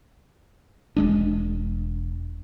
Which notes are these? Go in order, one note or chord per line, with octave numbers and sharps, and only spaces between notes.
E1 G#3 D4